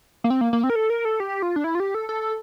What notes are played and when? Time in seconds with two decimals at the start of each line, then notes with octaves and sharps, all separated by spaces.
0.24 A#3
0.30 C4
0.41 A#3
0.53 A#3
0.64 C4
0.70 A#4
0.76 A4
0.90 A#4
1.05 A4
1.20 G4
1.42 F4
1.56 D4
1.64 E4
1.75 F4
1.80 G4
1.94 A4
2.09 A4